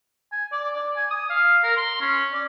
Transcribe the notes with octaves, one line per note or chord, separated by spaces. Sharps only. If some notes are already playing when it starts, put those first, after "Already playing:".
G#5
D5
D5
G#5
D#6
F5
A#4
C6
C#4
D5